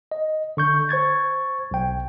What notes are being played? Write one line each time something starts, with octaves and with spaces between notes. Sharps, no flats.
D#5
D3 C#6 G6
C5 C#6 G#6 A6
B1 G5